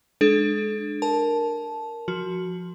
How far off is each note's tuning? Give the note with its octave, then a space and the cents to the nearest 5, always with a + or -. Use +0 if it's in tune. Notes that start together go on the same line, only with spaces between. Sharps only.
G#3 +0 D4 +20 A4 -40
A#4 +0 A5 -10
F3 +0 F#4 +0